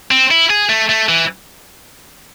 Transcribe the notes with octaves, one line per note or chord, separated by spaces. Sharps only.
C4
E4
G#4
A3
A3
E3